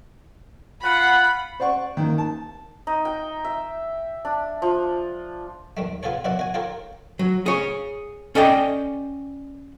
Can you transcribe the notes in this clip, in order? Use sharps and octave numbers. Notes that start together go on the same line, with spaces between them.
F4 F#5 B5
C5 D5 F#5 C#6
D#3 A#3
A5
D#4
G5
E5
D4
F3
D#2 G3 A3
B3 F4 G#4 A4 C#5
F#2 B2 C#4 E4 D5 F#5
F#4 G#5
F4 G4 A4 A#4 C#5
F#3
G#4 C#5
C#4 A4 D5 D#5 G5